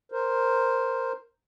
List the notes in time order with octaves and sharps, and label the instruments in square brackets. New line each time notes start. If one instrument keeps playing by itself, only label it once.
[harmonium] A#4 C5